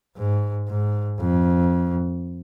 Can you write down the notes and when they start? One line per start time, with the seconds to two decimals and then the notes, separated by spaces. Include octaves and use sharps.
0.17 G#2
0.68 G#2
1.20 F2